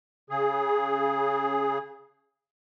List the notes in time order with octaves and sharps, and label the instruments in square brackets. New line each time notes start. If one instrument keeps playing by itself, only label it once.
[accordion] C#3 G#4